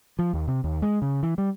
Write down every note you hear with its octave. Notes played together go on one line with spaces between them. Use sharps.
F3
D#2
C3
D#2
G#3
C#3
E3
G3